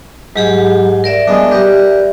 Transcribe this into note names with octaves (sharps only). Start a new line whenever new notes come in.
G#2 F#3 G4 G#4
A#4 D5 E5
G#3 B3 D4
G4 B4 A#5